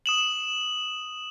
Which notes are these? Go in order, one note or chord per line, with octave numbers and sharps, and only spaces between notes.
D#6 E7 F#7